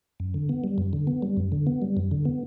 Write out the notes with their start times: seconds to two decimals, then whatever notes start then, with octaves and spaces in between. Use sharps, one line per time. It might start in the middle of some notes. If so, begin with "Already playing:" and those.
0.20 F#2
0.34 D3
0.49 B3
0.64 G3
0.78 F#2
0.93 D3
1.07 B3
1.22 G3
1.37 F#2
1.52 D3
1.67 B3
1.82 G3
1.97 F#2
2.11 D3
2.25 B3